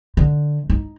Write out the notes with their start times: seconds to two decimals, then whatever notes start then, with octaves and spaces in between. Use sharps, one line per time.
0.17 D3
0.70 D#4